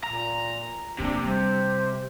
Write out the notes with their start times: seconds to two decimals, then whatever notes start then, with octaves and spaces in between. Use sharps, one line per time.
0.04 A#2 A#5
0.99 C3 F3 A#3 D4
1.24 G3 C5